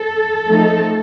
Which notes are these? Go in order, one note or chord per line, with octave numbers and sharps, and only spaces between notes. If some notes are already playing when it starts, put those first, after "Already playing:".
Already playing: A4
F3 A3 C4 D#4